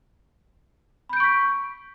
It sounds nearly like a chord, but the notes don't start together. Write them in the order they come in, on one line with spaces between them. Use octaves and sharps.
B5 G6 D7 C#6 B6